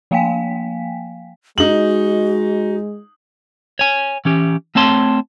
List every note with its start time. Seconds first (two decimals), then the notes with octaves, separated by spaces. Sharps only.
0.11 F3 A#3 F5 G5 G#5 B6
1.58 G#3 D#4 F#4 F#7
3.79 C#5 G#5
4.25 E3 C#4 G4
4.75 A3 C4 C#5 A5 C6